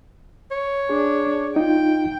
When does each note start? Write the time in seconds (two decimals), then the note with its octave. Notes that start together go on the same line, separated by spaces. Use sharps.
0.51 C#5
0.89 D4 G#4
1.56 D#4 F4 G5